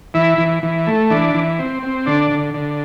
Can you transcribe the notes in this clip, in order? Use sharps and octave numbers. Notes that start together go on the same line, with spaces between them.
E3 E4
E3
E3
A3
E3 D4
E3
C4
C4
D3 D4
D3
D3